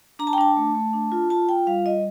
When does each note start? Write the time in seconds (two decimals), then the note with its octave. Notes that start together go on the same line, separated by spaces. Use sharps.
0.19 D4 A#5
0.27 A5
0.33 G5
0.38 D4 A5
0.57 A3
0.75 A3
0.93 D4
1.12 F4
1.30 F4 A5
1.49 F4 G5
1.67 G3 F5
1.86 G3 D#5